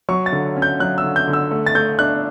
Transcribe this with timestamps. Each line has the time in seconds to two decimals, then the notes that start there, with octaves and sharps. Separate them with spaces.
0.09 F#3 C#6
0.26 A6
0.32 D3
0.56 C#4
0.62 G6
0.80 F#3 F#6
0.98 E6
1.04 D3
1.16 G6
1.27 D3
1.33 E6
1.51 A3
1.66 A6
1.75 A3 G6
1.99 D4 F#6